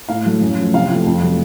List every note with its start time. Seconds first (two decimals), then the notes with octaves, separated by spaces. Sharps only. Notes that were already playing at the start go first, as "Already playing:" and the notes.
0.09 A2 F5
0.25 F#3 A3
0.41 F#2
0.57 F3 A3
0.74 C3 F5
0.90 F3 A3
1.06 F2
1.22 C3 F#3 A3